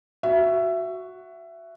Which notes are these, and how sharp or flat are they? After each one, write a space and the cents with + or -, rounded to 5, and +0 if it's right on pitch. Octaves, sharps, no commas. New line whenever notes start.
F#4 +0 E5 +20